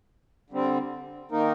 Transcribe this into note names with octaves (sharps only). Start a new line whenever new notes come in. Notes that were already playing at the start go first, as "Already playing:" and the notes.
D3 G3 C4
D#3 A#3 D#4 A#4